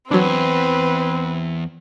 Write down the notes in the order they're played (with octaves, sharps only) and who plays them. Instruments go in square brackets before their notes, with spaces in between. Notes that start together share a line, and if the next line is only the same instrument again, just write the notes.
[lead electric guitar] E2 [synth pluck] F#3 D4 [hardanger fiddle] C4 [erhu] B4